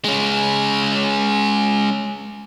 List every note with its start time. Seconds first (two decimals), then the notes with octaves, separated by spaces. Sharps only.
0.05 G#3 C#4